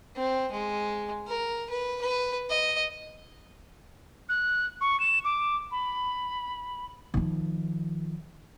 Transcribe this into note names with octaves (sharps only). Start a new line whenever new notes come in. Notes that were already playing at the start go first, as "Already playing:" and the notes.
C4
G#3
A#4
B4
B4
D#5
F#6
C#6
E7
D6
B5
D#3 F3